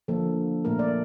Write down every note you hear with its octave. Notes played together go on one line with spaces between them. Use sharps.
D3 F3 A#3 A4
A#2 A3 A#4
D5